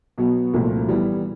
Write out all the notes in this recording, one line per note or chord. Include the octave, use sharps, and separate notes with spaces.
B2 F#3 B3
C2 A#2 F3 A3
E3 G3 B3